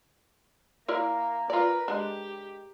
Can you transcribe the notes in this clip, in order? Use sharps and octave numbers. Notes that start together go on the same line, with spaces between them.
A#3 E4 A#4 D5
F4 A#4 B4 D5
G#3 D4 G4